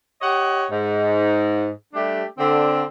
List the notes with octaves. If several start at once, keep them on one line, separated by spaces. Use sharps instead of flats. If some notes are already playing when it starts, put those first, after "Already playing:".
G4 C#5 D#5 F#5
G#2
G3 A3 D4 G4
D3 C4